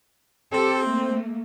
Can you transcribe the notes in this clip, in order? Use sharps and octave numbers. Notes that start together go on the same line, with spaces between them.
C4 G4 A4
A3 A#3